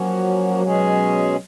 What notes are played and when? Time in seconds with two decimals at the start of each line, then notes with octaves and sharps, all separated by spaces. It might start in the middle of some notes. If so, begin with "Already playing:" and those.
Already playing: F3 F#3 A#3 C#4 F#4
0.63 B2 G#3 C#4 G#4